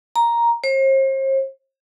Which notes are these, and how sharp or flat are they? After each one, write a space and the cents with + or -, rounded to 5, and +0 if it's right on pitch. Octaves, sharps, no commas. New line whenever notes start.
A#5 +5
C5 +40